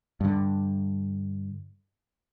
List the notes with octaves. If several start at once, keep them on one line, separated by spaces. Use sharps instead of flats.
G2 D3